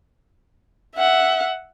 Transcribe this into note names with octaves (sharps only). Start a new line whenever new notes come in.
E5 F#5